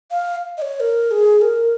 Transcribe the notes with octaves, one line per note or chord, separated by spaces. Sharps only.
F5
D#5
C#5
A#4
G#4
A#4